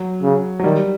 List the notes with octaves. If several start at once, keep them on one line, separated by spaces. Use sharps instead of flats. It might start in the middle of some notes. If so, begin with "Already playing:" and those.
Already playing: F#3
C#3
F#3
D#3 G3